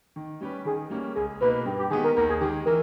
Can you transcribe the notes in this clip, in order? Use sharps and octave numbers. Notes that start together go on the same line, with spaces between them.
D#3
G3 C#4 G4 B4
D#3 G#4
G3 A#3 C#4
C#2 G#4
B2 A#3 D#4 B4
G2 G4
G4
D#3 G#3 B3 G4 G#4
A#4
D#2 A#4
G#4
D#3 G#3 G4
E3 A#4